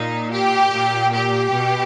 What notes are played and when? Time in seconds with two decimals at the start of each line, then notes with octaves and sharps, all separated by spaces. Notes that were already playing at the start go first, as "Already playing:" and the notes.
Already playing: A#2 D#4
0.32 G4
0.73 A#2
1.13 G4
1.54 B2